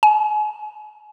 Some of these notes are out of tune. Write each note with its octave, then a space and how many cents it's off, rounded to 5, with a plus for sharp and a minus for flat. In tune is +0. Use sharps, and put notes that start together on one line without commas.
G#5 +35